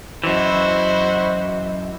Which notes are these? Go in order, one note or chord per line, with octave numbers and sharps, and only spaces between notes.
F#2 E3 E4 F#4 C5 D#5